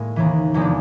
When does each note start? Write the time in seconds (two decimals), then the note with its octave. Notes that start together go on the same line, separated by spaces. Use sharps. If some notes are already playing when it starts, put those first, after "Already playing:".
Already playing: A2 G#3 A#3
0.16 D#2 C#3 E3
0.54 E2 C3 F3 G#3
0.62 D4